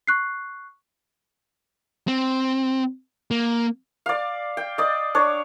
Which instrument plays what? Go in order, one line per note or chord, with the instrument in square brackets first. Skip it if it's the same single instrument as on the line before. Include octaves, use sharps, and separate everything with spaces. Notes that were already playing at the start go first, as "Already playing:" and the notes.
[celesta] C#6 F#6 C7
[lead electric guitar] C4
A#3
[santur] D5 F5
G5
D5 D#5
D4 C#5